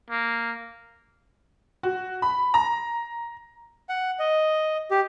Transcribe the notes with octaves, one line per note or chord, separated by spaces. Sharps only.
A#3
F#4
B5
A#5
F#5
D#5
G4